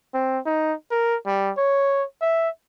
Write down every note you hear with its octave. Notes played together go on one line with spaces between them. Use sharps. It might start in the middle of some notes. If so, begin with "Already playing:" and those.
C4
D#4
A#4
G3
C#5
E5